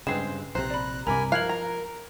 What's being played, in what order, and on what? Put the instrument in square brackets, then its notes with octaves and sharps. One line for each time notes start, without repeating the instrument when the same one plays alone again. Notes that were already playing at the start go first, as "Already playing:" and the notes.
[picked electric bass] G2 C#3 [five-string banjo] G#3 C4 [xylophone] B4 C7 E7
[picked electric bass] A#1 C3 [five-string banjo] C5 [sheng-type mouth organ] A#5 F#6
[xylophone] D5 B5
[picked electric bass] C2 G2 C3 [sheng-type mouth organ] A#4 G#5 B5 [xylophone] A#5 D6
[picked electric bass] F3 [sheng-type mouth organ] A#4 [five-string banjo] F5 [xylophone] F#6 G#6 F#7
[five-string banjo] A#5